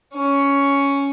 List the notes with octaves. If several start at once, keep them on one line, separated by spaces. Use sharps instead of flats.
C#4